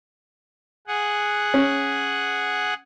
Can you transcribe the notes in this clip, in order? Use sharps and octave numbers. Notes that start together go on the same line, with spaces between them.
G#4 F#5
C#4